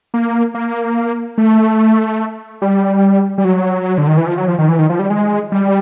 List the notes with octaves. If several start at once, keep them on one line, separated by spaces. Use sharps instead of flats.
A#3
A#3
A3
G3
G3
F#3
D3
D#3
E3
F3
F#3
F3
D#3
E3
D#3
F3
G3
G#3
G3